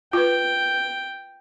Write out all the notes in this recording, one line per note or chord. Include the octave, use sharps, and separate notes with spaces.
F4 B4 G5